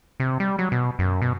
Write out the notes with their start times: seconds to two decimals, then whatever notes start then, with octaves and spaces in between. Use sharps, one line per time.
0.20 C3
0.40 G3
0.59 F#3
0.72 B2
0.99 F#2
1.22 B2